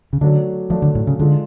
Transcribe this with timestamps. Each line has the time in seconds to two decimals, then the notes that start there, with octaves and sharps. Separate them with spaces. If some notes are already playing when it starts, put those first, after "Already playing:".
0.13 C#3
0.21 D3 F#3 A3 D4
0.70 F3 F#3 A3 D4
0.82 D3
0.95 A2
1.07 C#3
1.20 D3 G#3 D4 F4 A4